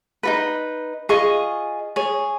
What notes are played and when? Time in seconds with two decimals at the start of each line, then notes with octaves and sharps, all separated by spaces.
0.23 D#4 F#4 B4
1.09 F4 G#4 D#5 C#6
1.96 G#4 C#5